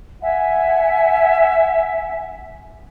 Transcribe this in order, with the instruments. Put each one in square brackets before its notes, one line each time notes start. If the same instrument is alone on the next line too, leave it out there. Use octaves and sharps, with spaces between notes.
[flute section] E5 F#5 G#5